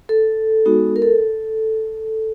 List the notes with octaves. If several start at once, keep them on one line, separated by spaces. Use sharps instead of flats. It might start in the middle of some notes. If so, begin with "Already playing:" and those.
A4
G#3 B3 D#4 F#4
A#4
A4